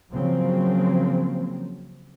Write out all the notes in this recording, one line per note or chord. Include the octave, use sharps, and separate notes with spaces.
C#3 F3 F#3 A#3 C4